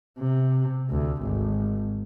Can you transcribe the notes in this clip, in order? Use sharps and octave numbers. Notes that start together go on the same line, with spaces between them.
C3
D2
G#1